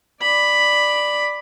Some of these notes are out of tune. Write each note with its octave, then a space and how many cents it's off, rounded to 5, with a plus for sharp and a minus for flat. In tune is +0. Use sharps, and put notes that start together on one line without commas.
D5 +5 B5 +0